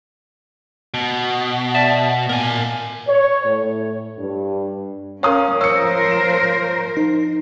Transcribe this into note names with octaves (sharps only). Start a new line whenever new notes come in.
B2
D5 E5 A5
A#2 A#4 G#5
C#5
A2
G2
C#4 A#4 C#5 F5 A#5 D#6
F3 A#4 C5 C#5 E6 C#7
E7
D#4